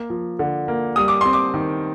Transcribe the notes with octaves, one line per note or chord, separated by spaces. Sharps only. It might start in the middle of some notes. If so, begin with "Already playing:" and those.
Already playing: A#3
F3
D3
A#3
G3 D#6
D6
C4 C6
D6
D#3